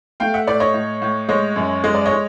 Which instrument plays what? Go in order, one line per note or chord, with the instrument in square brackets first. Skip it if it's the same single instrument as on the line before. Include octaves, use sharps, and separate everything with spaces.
[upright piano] A3 F5 G5
E5 F#5
A2 D5 E5
C#5 D#5
A2
A2
G#3 C#5 D#5
F#2
G#3 D#5
D5
C#5 D#5
G#3